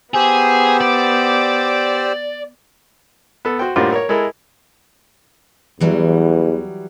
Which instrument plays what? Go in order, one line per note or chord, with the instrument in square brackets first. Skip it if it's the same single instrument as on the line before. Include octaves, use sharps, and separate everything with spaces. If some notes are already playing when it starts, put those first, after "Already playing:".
[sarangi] B3 [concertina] G4 C5 E6 [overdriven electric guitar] G#4
[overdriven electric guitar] D5
[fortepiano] B3 A4
F#4 C5 G5
A2 D3 G3 A#3 F4 C5
A#4 C#5
G#3 E4 A4 A#4
[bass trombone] E2 [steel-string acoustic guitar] E3 F#3 G3